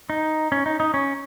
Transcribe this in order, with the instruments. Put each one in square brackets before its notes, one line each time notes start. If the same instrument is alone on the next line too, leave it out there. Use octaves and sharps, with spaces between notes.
[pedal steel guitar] D#4
C#4
D#4
D#4
C#4